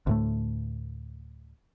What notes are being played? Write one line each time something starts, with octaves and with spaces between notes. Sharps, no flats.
D2 A2 A3